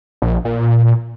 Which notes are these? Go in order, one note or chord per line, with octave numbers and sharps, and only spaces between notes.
A#1
A#2